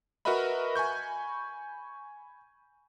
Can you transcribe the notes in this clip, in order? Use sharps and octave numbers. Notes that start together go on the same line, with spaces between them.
F#4 A#4 B4 D#5 E5 B5
G#5 B5 C#6 G6